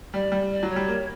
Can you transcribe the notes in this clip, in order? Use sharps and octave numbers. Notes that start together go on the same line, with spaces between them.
G3 D5
G3
D5
F#3
C#5
G3
A#3